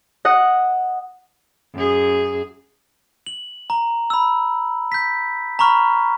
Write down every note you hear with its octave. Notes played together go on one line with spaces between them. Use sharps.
D#5 F#5
F#2 G#4
F#7
A#5
B5 E6
G6 B6
A#5 B5 C#6 F6